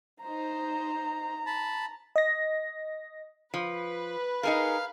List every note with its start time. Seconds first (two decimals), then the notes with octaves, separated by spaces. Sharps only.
0.22 D#4 C5 A#5
1.46 A5 B5
2.16 D#5 A#6
3.54 F3 B4
4.43 D#4 G#4 A#4 F5